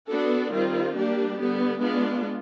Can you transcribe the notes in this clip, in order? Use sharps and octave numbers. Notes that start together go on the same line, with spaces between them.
B3 D4 F#4 A4
D#3 G3 C4 F4
G3 A#3 D4 G4
D3 G3 B3
G#3 B3 D4 F4